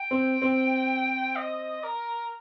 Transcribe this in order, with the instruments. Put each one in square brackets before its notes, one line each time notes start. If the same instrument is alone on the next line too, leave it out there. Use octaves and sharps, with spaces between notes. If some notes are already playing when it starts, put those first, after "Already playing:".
Already playing: [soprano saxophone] G5
[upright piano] C4
C4
[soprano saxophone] D#5
A#4